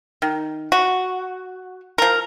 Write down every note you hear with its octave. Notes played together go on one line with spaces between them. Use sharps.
D#3
F#4
F3 A#4